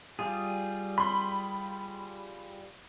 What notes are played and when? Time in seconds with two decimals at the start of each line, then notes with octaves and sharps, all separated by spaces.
0.19 G3 F4 G#4
0.98 B5 C6